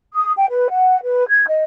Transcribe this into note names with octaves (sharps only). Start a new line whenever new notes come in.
D#6
G5
B4
F#5
B4
G#6
D#5